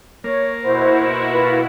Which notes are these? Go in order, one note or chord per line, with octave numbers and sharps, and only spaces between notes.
A#3 C#5
B2 E4 F#4 C5
F4 B4